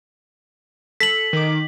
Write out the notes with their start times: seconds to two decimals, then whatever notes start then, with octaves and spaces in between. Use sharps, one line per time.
1.00 A4 B6 F#7
1.33 D#3 D6